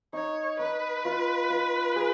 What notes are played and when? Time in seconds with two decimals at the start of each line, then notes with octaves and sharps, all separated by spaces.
0.13 D#4 C#5
0.59 D#4 B4
1.05 F4
1.50 F4
1.96 G#4